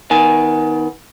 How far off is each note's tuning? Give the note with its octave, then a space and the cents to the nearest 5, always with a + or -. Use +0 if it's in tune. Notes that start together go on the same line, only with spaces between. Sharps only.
D#3 +20 B3 +0 G#5 +0